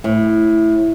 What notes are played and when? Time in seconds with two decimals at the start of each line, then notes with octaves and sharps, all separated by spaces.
0.04 A2